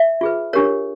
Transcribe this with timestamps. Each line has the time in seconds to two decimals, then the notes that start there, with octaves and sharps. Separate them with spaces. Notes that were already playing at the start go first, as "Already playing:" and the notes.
Already playing: E5
0.21 F4 G#4 B4
0.53 D4 G4 A#4 C#5